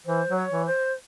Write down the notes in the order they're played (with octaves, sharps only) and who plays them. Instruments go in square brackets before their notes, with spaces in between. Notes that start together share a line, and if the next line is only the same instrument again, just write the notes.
[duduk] E3 [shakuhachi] C5
[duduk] F#3
[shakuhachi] C#5
[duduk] E3
[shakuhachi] C5